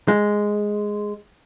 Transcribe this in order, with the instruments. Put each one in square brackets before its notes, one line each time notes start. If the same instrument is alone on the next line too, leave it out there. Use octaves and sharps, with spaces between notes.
[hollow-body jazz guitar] G#3